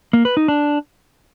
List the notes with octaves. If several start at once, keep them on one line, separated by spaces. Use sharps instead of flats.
A#3
B4
D#4
D4